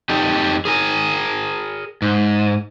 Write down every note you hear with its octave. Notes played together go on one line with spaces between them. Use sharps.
F2 D#4 G4 A4
G#4 A#4 G#5
G#2